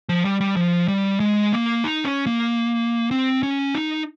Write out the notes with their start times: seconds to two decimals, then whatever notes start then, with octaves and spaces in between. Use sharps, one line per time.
0.09 F3
0.25 G3
0.41 G3
0.56 F3
0.88 G3
1.20 G#3
1.52 A#3
1.84 D#4
2.05 C#4
2.26 A#3
3.11 C4
3.43 C#4
3.75 D#4